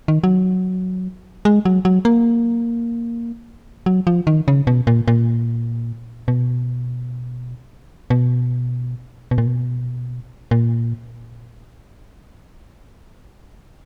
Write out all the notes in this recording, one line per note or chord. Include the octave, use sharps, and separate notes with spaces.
D#3
F#3
G#3
F#3
F#3
A#3
F#3
F3
D#3
C#3
B2
A#2
A#2
B2
B2
B2
A#2
B2
A#2